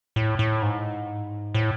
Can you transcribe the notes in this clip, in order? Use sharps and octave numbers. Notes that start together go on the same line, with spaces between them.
A2
A2
G#2
A2